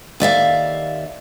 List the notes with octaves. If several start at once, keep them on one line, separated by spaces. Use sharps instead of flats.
D#2 D5 E5 F5